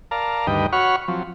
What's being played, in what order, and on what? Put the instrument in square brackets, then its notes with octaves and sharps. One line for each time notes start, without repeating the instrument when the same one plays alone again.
[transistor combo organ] A#4 D5 F5 A5 A#5
D2 G2 D#3 B4 D#5 G5
F#4 C#5 F#5 B5 C#6 F6
F3 F#3 C4